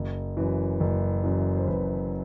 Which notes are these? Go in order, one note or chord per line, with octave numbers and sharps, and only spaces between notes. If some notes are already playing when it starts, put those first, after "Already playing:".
Already playing: F#1
F#2 E3
F#1
F#2 E3
C5
F#1 B4